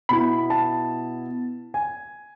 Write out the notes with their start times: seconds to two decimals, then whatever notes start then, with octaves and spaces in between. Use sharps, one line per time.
0.09 B2 B3 E4 B5
0.50 A5
1.74 G#5